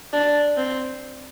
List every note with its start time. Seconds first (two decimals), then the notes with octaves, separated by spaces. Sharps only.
0.13 D4
0.57 C4